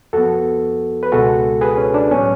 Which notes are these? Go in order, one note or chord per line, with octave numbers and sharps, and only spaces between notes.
F2 F3 B3 F#4 A4
B4
C#2 B2 G#3 F#4 A4
G#4 B4
C#4
D4
A2 F#3 B3 C#4